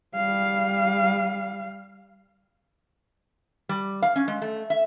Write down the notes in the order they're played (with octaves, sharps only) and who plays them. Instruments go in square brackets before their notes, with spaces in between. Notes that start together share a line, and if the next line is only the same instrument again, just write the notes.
[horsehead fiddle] G3 F5
[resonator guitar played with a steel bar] G3
F5
C#4
G#3
A3
E5